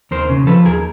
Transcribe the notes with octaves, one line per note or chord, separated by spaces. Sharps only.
D#2 A#4 C5
C#3
F3 A4 B4
D#2 G#4 A#4